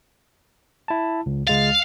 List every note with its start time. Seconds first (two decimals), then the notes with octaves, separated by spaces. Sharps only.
0.88 E4 A5
1.26 C#2
1.47 C#2 G#3 F5 A6